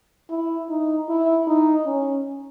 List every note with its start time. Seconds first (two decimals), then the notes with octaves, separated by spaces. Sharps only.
0.30 E4
0.69 D#4
1.09 E4
1.47 D#4
1.86 C#4